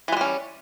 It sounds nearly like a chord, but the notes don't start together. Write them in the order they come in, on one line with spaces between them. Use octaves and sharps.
E3 G#3 G3 C#4